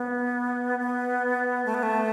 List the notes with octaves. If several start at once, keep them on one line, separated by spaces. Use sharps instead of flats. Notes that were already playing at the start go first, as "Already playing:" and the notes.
Already playing: B3
B3
A3
B3
A3